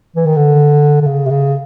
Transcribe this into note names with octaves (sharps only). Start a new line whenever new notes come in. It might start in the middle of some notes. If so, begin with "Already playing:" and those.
E3
D#3
D3
D3
C#3
C3
C#3